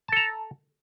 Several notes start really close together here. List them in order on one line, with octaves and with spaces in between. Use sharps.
A5 A4 A#5